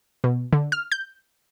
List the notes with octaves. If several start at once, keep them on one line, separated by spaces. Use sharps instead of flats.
B2
D3
F6
G6